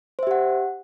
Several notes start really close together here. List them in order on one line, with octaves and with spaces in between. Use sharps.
C5 E5 G4 F#5